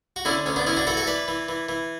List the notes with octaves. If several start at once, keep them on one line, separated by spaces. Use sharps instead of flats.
F#4
D3 C#4 E4
D2 C#4
B3 D4
E3 C#4 E4
D4 F#4
E3 F#4 A4
F#4 A4
E3 B4 D5
E3
E3
E3